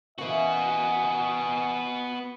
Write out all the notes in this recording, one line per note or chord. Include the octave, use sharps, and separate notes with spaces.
E3 A#3 B3 C#4 F#4 D#5 G#5